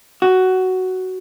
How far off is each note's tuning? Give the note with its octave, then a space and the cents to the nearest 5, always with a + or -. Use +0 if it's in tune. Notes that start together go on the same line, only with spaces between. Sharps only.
F#4 +10